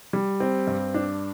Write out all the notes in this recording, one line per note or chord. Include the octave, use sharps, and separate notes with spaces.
G3
C4
G2
D4